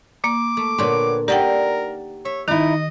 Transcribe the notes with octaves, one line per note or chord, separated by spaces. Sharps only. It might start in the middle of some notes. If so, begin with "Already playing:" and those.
A#3 D6
A3
A#2 D3 F#4 B4 C#5 G5 C6
D#4 G4 A#4 D5 E5 F#5 G5 A5
C#5 E5
D#3 D#4 E4 D#5